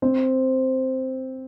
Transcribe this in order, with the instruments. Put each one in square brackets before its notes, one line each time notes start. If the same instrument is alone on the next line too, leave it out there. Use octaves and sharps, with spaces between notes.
[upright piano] C4 C5